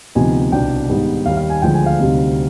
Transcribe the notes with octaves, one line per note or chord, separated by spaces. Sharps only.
D2 C3 F3 B3 D#4 G#5
C2 B2 B3 D4 G5
G#2 D#3 G3 B3
D#2 D#3 G3 F5
F5
G#5
D2 D3 F3 G#3 G5
G#5
F5
D2 C3 G3 C4 D#4